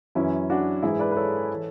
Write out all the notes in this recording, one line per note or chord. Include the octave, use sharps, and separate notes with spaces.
F#2 E3 C#4 E4
D4 F#4
G#2 E3 E4 G#4
B4 D5
B4
A4 C#5
E3